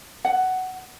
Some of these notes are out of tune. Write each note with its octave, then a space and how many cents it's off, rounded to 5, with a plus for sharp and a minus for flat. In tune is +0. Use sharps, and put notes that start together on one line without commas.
F#5 +10